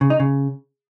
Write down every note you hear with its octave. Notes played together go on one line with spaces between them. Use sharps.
C#3
D#4
C#3